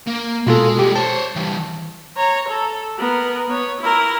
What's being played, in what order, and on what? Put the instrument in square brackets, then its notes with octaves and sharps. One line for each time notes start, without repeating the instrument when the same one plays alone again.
[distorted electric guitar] A#3
[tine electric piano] B2 F4 A4 [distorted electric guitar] G#3 G#5
[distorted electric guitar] G3 G#3 [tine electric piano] G4
[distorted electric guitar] C5 C#5 [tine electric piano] A5
[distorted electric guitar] E3 G3
[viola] C#5 A#5
A4
B3 A#4
B3 C#5
E4 A#4